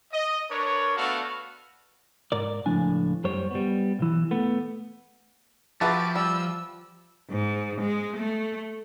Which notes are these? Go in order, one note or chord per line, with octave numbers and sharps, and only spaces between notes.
D#5
D4 A#4 B4 C#5
A3 B3 D4 F#4 A4 F5
G#2 A#4 D5
C#2 A2 F3 D4 G#5
F#2 G3 C5 C#5
G3 B3
B1 E3
A3 B3
F3 F#4 G4 B4 E5 A5 D6
G3 E6
G#2
G#3
A3